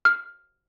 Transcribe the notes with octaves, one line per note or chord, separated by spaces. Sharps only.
F6